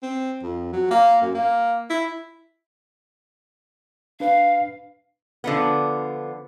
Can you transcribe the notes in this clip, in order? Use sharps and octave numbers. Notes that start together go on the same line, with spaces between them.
C4
F2
F#3
A#3
F#2
A#3
E4
D4 B4 F5
D3 F3 B3